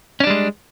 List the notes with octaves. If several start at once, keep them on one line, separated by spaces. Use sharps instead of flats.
G3 G#3 C#4 D4